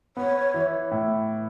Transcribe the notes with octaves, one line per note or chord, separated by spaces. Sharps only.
B3 C#5
E3
A2